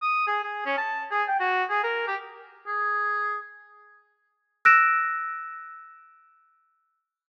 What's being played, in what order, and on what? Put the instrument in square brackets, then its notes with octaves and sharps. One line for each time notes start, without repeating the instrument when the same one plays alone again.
[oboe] D#6
G#4
G#4
C#4
A5
G#4
G5
F#4
G#4
A#4
G4
G#4
[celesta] E6 F#6 A#6 D7 E7